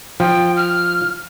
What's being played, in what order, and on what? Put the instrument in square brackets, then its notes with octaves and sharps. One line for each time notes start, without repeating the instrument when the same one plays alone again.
[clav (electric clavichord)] F3 [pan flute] G5
[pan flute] F6